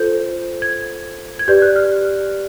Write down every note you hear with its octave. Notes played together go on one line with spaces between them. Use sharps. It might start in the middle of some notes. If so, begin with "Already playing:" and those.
Already playing: F4 A4 C5 G6
G#6
G#6
G4 B4 D5 G6
F#6
F6